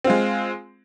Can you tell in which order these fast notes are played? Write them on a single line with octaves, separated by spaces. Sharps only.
C4 F4 G#3